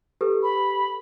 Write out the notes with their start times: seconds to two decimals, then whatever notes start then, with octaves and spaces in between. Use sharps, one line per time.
0.21 G4 A4 B4
0.43 B5